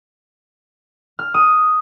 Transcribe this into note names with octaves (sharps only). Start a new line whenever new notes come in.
F6
D#6